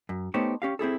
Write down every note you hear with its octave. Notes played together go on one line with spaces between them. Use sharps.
F#2
A3 B3 D#4 G4 C5 C#5
C#4 G4 F5
C4 E4 G#4 A4